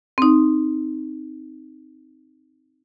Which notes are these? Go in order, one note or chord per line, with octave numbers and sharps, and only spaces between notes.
C4 D#4